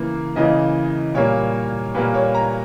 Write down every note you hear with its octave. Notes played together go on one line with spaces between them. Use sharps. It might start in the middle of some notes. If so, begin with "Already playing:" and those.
Already playing: C#3 E3 A#3
C#3 E3 A#3 D#5
A#2 G3 A#3 C#5
A#2 G3 A#3 B4
C#5
A#5